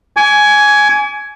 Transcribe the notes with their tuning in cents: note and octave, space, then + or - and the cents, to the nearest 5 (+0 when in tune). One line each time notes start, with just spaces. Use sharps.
G#5 +10 D6 -40